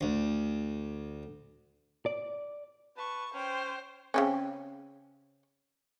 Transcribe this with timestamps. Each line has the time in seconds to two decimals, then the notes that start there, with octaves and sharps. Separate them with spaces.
0.01 D2
2.06 D5
2.97 B4 A5 C#6
3.34 C#4 C5 G5
4.14 C#3 C4 C#4